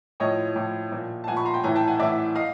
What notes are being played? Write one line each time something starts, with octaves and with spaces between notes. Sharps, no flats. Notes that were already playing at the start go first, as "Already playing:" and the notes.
A2 F3 C#5 D#5
A2 F3
A#2 F3
A5
A#2 F3 F#5 G#5
B5 C#6
A#5 C6
G5 A5
A2 E3 G#5 A#5
G5 A5
F#5 G#5
A2 E3 D5 E5
D#5 F5